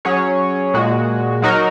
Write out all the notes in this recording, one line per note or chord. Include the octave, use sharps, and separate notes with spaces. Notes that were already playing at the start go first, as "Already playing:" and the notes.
F#3 C#4 G#4 C#5
A#2 G#3 F#4
F#3 D#4 F#4 A#4